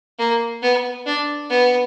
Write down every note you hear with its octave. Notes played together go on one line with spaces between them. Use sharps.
A#3
B3
D4
B3